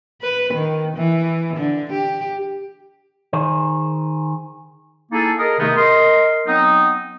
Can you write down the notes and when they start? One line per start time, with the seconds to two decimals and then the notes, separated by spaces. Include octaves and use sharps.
0.22 B4
0.53 D#3
0.96 E3
1.57 D3
1.92 G4
3.33 D#3 G#4 C5
5.12 A#3 D#4 E4 G#4 A4
5.38 G#4 A#4 D#5
5.60 C3 D#3 A3 B3 D#4
5.77 A#4 D#5 C6
6.47 F#3 B3 C4 D#4